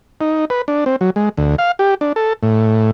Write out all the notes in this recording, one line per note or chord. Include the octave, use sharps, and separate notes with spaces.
D#4
B4
D4
C4
F#3
G#3
D2
F5
G4
D4
A4
A2